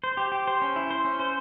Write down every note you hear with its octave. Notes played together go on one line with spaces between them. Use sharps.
C5
G4
G4
C5
C#4
E4
C5
C#4
C5